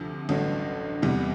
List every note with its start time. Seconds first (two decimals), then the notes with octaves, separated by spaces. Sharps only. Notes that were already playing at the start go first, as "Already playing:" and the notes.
Already playing: D2 C3 F3
0.29 A1 G2 D3 F#3 A3
1.02 E2 C3 E3 G3 B3